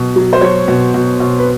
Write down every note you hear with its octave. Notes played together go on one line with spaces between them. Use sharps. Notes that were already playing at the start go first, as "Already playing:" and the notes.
Already playing: B2 F#3
F#3
C5
F#3 C#5
B2
B2
B2
B4